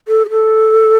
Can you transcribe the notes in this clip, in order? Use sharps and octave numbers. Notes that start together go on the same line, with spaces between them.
A4
G#4
A4